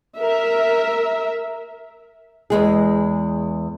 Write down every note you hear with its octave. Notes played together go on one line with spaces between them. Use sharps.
A#4 E5
E2 G#3 G#4